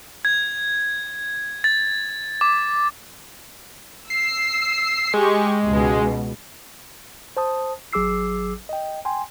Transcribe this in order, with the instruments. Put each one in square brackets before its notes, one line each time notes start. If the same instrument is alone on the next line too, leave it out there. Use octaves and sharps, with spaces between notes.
[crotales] G#6
A6
D6
[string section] E6 [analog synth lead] C7
[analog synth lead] G#3 [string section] G4 C#6
[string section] C#2 B2
[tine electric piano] C5 A5 D#6
G#1 F#3 G#4 D6 E6 C7
D#5 G5
G5 G#5 C6